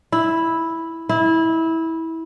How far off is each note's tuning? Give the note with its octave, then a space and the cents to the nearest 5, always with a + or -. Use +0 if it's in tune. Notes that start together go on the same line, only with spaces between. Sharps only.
E4 -5
E4 -20